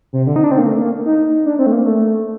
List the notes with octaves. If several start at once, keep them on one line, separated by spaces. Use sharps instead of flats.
C3
D3
D#4
D4
C4
A#3
A3
A#3
D#4
D4
C4
A3
A#3
A3